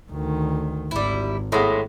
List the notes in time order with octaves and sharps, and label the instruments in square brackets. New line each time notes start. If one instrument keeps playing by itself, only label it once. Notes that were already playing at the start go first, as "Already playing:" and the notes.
[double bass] D2 D#3
[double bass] G#1 [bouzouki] G3 E4
[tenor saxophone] A2 [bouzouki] G#3 B3